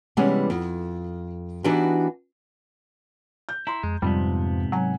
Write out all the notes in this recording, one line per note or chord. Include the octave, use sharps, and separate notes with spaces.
C3 E3 G3 G#3 B3 C#4
F2
E3 B3 D4 D#4 F#4 G4
G6
E4 A#5 C6
F2 G#3
F2 G#2 C3 F3 G3 B3
F#3 F#5 G#5